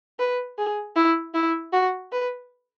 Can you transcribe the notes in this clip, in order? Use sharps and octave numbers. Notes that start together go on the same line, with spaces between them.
B4
G#4
E4
E4
F#4
B4